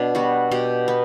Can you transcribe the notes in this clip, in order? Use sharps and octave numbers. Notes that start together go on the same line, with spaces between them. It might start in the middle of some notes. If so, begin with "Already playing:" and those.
Already playing: B2 D4
G3 B3 F#4
B2 G4
B3